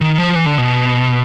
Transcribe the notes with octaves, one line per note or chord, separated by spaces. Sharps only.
D#3
F3
E3
D3
B2